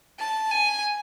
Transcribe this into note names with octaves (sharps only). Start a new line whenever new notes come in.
A5
G#5